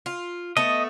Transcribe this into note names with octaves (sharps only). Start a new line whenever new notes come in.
F4
A3 B3 D#5